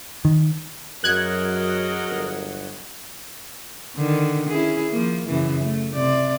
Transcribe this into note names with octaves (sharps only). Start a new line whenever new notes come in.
D#3
F#2 F#3 F#4 G#4 A#4 D#5 F#6 G#6
G1
D3 D#3
C#4 E4 G#4
F3 A#3
F#2 C#3 E3
A3
C3 D5